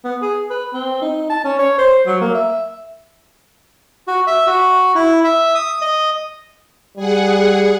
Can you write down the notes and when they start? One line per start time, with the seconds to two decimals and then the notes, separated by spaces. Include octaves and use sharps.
0.04 B3
0.22 G#4
0.50 B4
0.74 C4
1.02 D#4
1.30 A5
1.44 C#4
1.59 C#5
1.78 C5
2.07 F#3
2.21 A#3
2.34 E5
4.07 F#4
4.27 E5
4.47 F#4
4.95 E4
5.24 E5
5.55 D#6
5.81 D#5
6.96 G3 G#4 F#5